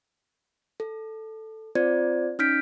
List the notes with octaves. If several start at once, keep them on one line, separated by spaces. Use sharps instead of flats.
A4
C4 F4 C5 D5 G#6
C#4 D#4 F6 G6 B6 D7